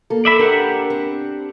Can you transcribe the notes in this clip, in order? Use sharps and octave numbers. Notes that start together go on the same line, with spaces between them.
A#3 A4
D5 E5 B5
D4 G4 A#4 F#5
C4